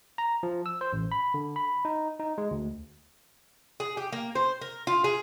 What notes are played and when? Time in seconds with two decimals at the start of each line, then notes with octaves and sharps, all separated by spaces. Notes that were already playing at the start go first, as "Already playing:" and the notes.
0.18 A#5
0.43 F3
0.66 E6
0.81 C5
0.93 A1
1.12 B5
1.34 D3
1.56 B5
1.85 D#4
2.20 D#4
2.38 G#3
2.51 D2
3.80 G#4
3.97 G4
4.12 A#3
4.35 C5
4.61 A#4
4.87 F4
5.04 G#4